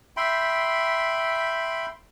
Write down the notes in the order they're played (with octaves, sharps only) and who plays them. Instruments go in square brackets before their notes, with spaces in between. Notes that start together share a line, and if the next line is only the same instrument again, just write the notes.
[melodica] E5 G5 B5 C6